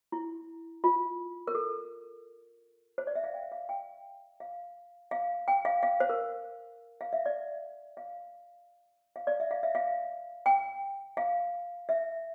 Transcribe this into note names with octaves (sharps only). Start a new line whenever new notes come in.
E4
F4
A#4
A4
C5
D5
E5
F5
G5
F5
G5
F5
F5
G5
F5
F5
C5
A#4
F5
E5
D5
F5
F5
D5
E5
F5
E5
F5
G5
F5
E5